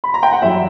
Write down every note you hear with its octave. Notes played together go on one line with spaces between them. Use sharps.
B5
A#5
G5
F#5
F#2 E3 G3 E5